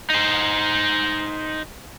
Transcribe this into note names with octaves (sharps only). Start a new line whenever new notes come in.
D#4 C5